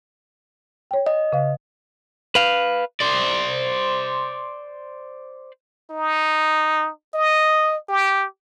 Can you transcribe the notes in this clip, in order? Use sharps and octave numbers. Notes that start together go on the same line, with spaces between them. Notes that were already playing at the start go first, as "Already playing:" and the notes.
C#5 G5
D#5
C#3 F5
B4 F5
C5 D5
D#4
D#5
G4